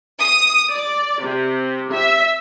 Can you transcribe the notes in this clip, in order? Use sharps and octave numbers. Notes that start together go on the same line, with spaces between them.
D#6
D5
C3
E5